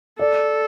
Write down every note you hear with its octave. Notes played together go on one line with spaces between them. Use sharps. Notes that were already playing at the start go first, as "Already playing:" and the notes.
A4 D5